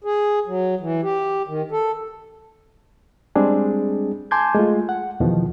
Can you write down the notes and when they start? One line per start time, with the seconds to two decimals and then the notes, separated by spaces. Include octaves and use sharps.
0.04 G#4
0.47 F#3
0.80 E3
1.03 G4
1.47 D#3
1.71 A4
3.35 G3 G#3 C4 D4 G#4
4.31 G#5 A5 C6 D6 G6 G#6
4.55 G#3 A3 F4
4.89 F#5
5.20 E2 B2 D#3 F3